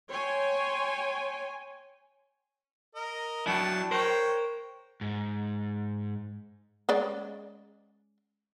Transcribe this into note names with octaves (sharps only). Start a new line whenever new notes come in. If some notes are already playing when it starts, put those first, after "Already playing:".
C#5 G5 G#5 C6
A#4 D#5
F#3 D4 E4 G5 A5
A#4 C5 C#5 G5
G#2
G#3 C#4 D5